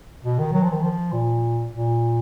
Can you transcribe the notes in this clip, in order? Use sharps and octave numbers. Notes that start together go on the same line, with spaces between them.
B2
D#3
F#3
F3
D#3
F3
A#2
A#2